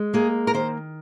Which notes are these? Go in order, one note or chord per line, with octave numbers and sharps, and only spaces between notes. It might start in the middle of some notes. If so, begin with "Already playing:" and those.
Already playing: G#3
A#3 G#4
A#4
D#3 C5